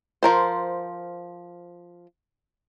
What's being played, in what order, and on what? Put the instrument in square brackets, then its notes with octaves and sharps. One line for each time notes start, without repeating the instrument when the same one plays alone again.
[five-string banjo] F3 A#4 C5